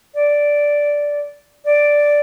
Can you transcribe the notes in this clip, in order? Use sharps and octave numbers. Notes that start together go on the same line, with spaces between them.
D5
D5